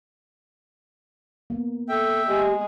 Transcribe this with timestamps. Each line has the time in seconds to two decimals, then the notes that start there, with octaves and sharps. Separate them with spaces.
1.50 A#3 B3
1.89 A4 E5 G5
2.27 G#3 G4